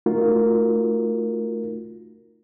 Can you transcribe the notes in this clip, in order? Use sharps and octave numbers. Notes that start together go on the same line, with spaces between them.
A3 D#4 F4 F#4 A#4